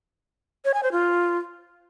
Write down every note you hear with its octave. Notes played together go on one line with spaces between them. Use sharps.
C#5
G#5
C5
F4